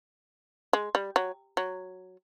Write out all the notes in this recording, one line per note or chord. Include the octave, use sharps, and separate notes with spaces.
G#3
G3
F#3
F#3